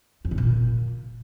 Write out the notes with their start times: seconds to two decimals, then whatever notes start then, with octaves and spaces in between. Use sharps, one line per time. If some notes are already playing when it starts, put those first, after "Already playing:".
0.25 F2
0.31 D3
0.38 A#2